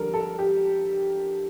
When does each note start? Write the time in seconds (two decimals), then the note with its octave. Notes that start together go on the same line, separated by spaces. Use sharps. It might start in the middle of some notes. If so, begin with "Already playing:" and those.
Already playing: F2 D3 G3 A4 A#4
0.14 A4
0.39 G4